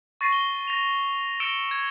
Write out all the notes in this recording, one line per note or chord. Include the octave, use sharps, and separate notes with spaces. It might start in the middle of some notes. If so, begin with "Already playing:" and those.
C#6 A6 A#6 C7 D#7
G7
A#6 F7
E6 A#6 C#7 D7 E7 G7
G#6